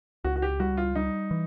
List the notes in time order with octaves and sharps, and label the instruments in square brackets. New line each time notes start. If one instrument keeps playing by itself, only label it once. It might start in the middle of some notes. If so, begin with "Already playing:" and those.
[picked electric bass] C#2 [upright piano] F#4
[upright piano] F#4
G4
[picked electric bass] G3 [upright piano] F#4
[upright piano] F4
[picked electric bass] G3 [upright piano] D#4
[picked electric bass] E3